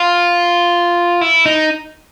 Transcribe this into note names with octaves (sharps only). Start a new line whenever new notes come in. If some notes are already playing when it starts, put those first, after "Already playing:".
Already playing: F4
E4
D#4